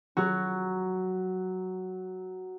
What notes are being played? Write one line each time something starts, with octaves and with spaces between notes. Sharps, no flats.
F#3 F#4